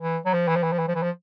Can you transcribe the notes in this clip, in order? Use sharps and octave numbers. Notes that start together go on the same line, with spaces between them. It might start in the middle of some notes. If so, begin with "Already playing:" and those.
E3
F#3
F3
E3
F3
E3
F3
E3
F3
E3
F3